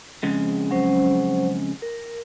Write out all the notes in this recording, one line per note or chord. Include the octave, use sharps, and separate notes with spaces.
F2 C#3 G#3
F#3 C#4 C5
A#4